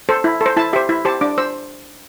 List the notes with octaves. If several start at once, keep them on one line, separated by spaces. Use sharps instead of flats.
A4 C5
E4
A4
C5
E4 A5
G4 C5 E5
E4 E5
G4 C5 A5
D4 D6
C5 E6